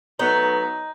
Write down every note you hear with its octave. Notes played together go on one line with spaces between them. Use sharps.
F#3 A3 B3 D#4